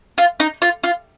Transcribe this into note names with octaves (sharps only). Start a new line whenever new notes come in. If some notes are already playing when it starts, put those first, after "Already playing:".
F4
D#4
F4
F4